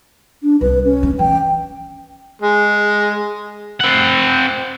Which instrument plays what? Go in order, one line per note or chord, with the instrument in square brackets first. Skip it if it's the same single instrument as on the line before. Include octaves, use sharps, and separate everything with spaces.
[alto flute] D4
[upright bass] C2 [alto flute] B4
[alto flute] C#4
[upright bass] D#3 F3
[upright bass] E3 [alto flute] G5
[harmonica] G#3
[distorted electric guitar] C4 F#5